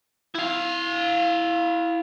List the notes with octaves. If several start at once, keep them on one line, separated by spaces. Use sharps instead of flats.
E4 F5